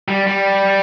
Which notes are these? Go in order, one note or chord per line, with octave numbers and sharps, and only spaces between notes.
G3
G3